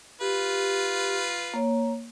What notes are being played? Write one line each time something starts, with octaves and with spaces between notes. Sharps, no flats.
F4 G4 B4
A#3 C#5